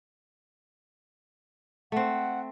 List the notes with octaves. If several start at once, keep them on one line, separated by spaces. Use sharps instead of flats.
A3 C4 F#5